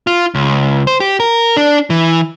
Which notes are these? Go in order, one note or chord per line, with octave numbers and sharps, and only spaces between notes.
F4
C#2
C5
G4
A#4
D4
E3